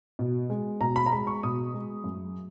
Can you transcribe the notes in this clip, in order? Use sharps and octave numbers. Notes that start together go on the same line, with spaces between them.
B2
G#3
B2 A#5
B5
A#5
G#3 B5
C#6
B2 D#6
G#3
F#2